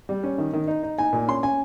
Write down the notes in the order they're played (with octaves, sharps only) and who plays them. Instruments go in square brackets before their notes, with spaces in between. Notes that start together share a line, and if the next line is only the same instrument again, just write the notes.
[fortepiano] G3
C#4
D#3
D#3
D#4
D#4
D#4 G#5
A#2
C#4 C6
C#4 G#5